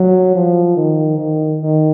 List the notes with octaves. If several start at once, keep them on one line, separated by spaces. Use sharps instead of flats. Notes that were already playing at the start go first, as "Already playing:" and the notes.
Already playing: F#3
F3
D#3
D#3
D#3